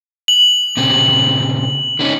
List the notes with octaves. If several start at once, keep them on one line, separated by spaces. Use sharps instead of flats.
F#7
A#2 C#3 C4
D3 C#4 D#4